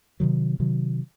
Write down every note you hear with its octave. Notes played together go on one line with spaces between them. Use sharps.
C3 D#3 F#3
C3 D#3 F#3